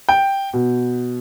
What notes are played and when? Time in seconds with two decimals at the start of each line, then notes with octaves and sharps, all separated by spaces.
0.09 G5
0.53 B2